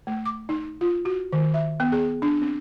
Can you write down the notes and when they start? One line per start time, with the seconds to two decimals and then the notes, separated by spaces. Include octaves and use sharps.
0.07 A3
0.25 D6
0.49 D#4
0.81 F4
1.05 F#4
1.32 D#3
1.54 E5
1.80 B3
1.92 G#4
2.22 D4
2.42 C4